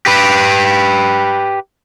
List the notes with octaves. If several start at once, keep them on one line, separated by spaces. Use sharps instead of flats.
G4 B4